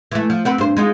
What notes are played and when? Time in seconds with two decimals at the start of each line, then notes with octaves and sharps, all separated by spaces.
0.11 E3 A3
0.30 F3
0.45 C4 F#4 B4
0.58 G2 C5
0.77 G#3 D#4 F4